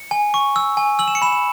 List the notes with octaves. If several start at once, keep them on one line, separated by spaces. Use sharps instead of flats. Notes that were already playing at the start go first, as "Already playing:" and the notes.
Already playing: C#7
G#5
C#6
E6
G#5
E6 F#7
E7
C#7
B5 E7
E7